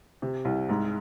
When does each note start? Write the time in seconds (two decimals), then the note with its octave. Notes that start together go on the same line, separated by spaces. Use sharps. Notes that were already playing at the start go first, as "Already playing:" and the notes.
0.22 C3
0.45 C2
0.69 G#2